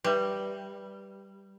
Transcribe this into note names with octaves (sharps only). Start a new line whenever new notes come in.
G3 B4 E5